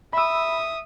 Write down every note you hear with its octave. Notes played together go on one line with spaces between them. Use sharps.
E5 B5 D#6 E6